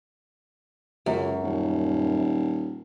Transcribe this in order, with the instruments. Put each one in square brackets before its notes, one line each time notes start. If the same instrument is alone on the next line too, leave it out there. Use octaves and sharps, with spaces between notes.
[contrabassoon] C#2 [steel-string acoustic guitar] F#2
[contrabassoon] D#1